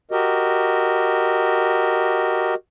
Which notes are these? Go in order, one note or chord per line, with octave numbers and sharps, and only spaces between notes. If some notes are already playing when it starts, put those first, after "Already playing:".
F#4 G4 A#4 D#5